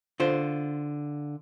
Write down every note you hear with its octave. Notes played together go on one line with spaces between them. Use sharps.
D3 F4 C5